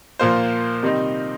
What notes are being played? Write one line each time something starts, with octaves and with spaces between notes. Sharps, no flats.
A#2 F3 A#3 F4 C5
C3 D#3 G3 C4 D#4